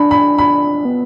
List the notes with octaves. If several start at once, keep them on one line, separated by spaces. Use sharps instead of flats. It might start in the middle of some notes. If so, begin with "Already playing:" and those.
Already playing: D4 B5
B5
B5
B3